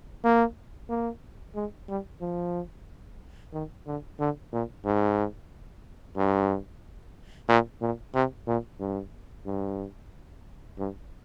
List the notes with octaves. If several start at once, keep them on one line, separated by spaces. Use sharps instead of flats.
A#3
A#3
G#3
G3
F3
D#3
D3
D3
A#2
G#2
G2
A#2
A#2
C3
A#2
G2
G2
G2